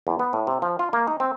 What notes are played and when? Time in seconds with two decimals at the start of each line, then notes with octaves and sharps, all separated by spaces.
0.07 E2
0.19 B3
0.33 A2
0.47 C3
0.62 F3
0.79 F4
0.93 A#3
1.07 D#4
1.20 C4